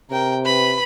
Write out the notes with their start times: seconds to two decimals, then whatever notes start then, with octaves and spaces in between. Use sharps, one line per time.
0.11 C3 A#4 G5
0.45 B4 B5